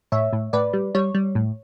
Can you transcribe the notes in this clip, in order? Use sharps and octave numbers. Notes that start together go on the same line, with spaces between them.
A2 C#5 E5
A2
A2 B4 D5
G3
G3 C#5
G3
A2